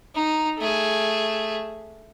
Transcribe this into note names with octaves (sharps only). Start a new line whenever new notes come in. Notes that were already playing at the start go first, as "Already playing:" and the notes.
D#4
A3 G#4